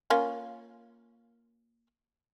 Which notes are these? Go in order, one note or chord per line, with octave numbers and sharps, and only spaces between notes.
A#3 C#4 F4